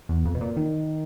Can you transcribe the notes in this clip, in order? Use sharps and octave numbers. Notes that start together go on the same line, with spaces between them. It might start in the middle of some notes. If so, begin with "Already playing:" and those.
E2
F2
B2
A#2
D#3